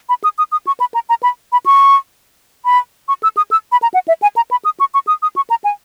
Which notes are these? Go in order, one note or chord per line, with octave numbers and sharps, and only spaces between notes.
B5
D#6
D#6
D#6
C#6
B5
A#5
A#5
B5
B5
C#6
B5
C#6
E6
D#6
E6
B5
A#5
F#5
E5
G#5
A#5
B5
D#6
C#6
C#6
D#6
D#6
C#6
A#5
G#5